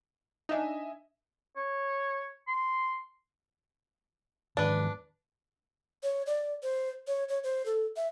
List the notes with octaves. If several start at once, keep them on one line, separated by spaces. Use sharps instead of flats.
D4 D#4 D#5 E5 G#5
C#5
C6
E2 G#2 D#3 D4 B4
C#5
D5
C5
C#5
C#5
C5
A4
E5